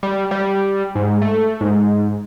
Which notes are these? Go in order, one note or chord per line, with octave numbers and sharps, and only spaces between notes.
G3
G3
G#2
A3
G#2